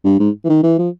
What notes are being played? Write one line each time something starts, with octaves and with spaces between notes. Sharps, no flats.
G2
G#2
E3
D#3
E3
F3